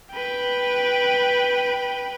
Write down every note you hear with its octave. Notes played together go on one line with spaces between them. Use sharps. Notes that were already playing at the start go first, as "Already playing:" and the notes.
B4 G5